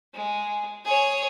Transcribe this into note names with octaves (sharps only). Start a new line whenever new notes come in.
G#3
G#4 C#5